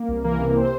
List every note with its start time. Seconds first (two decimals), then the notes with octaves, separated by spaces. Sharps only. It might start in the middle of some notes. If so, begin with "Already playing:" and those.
Already playing: A#3
0.08 C2
0.24 E3 A#3 A#4
0.40 C3
0.56 C3 C4 C5